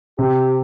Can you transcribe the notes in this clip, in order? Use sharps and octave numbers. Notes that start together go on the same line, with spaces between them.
C3 G4